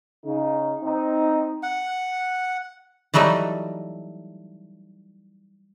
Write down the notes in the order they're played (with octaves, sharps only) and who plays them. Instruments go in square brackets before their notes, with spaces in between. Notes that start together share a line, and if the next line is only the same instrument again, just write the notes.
[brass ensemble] C#3 D#4
C4 D#4
[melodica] F#5
[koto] E3 F#3 G3 A3 D#4